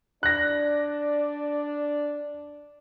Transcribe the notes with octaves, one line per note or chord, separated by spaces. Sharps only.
D4 D5 F#6 A#6